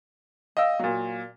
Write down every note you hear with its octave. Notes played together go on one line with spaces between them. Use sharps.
D5 D#5 F5 G5 E6
A#2 F#3